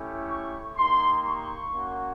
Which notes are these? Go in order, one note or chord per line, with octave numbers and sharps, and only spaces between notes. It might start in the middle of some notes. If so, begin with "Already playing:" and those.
Already playing: A3 C#4 E4 G4
C#6
A#3 D#4 G4 C6
C#6
A#3 C#4 F#4